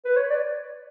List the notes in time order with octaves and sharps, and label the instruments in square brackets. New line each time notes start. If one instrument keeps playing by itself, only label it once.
[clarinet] B4
C#5
D5